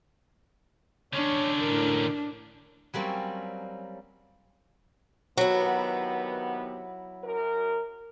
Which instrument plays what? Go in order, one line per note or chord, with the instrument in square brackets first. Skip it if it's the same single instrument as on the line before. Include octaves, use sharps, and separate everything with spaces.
[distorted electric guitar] D3 C#4 [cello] D4 [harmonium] C#5
[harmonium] A2 A#4
[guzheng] F#3 G3 A#3 C4 C#4
[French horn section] C3 D#3 B3 [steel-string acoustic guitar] F#3 E4
[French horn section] F#2 A#4